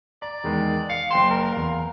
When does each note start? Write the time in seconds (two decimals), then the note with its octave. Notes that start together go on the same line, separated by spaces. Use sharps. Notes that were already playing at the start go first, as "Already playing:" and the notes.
0.22 D5 A#5
0.44 E2 D#3 G#3
0.90 F5 C#7
1.11 F#1 G5 C6 E7
1.31 A#4
1.52 E2 F5